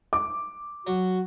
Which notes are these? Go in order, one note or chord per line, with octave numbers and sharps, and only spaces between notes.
D6
F#3 F#4